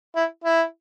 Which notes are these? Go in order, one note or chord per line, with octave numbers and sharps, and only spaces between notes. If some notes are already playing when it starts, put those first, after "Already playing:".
E4
E4